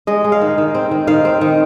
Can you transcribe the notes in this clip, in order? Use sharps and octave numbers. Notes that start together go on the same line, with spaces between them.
G#3 D#5
G#3
F5
D#3
D#3
C4
D#3
D#3 F5
C4
D#3